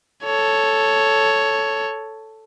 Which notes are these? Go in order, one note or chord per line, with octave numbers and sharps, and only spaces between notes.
A4 C#5